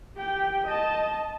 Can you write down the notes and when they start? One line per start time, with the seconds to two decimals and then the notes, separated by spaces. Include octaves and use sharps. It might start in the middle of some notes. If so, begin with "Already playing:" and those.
0.17 G4 G5
0.67 D#5 A5